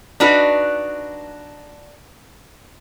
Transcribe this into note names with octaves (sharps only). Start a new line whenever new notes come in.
D4 D#4 F#4 B4